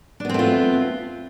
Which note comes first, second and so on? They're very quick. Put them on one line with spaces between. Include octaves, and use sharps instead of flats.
D4 B3 C4 A3 F4